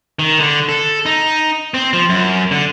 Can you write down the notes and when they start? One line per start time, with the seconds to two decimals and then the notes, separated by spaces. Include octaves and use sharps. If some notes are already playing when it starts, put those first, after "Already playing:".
0.19 D#3
0.40 D3
0.69 A4
1.06 D#4
1.74 C4
1.93 F3
2.09 F#2
2.51 D3